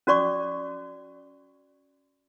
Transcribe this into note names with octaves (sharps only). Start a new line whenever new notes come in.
C#4 F#4 D5 C#6 D6